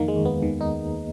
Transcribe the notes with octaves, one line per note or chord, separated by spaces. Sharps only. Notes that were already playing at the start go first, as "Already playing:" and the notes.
Already playing: F2 D#3 A#3
G#3
D#2
B3
D#3
D#4